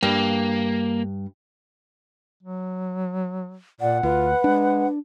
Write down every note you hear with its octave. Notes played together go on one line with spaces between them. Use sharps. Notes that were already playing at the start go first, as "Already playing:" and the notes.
G2 A#3
F#3
A#2 D5 F#5
D2 F4 B4
G#3 D4